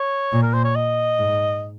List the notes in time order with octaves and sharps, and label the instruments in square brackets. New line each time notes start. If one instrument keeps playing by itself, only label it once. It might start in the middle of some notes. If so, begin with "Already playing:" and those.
Already playing: [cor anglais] C#5
[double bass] A#2
[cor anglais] A#4
C5
C#5
D#5
[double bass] G#2